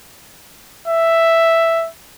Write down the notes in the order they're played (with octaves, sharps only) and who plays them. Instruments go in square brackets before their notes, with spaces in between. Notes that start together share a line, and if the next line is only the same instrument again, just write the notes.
[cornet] E5